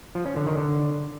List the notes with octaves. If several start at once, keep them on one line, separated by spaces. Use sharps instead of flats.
F3
C#4
D3
D#3
D3